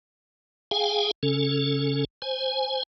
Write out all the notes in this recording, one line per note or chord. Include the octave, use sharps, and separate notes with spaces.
G#4 F5 G5 G#5
C#3 C#4 A4
C5 G#5